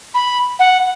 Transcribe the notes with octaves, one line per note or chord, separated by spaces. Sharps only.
B5
F#5